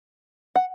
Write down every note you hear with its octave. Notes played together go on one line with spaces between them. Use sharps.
F#5